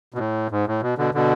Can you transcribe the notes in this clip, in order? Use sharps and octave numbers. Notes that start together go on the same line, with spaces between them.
B2
A2
G#2
A2
B2
B2 D3
B2 D3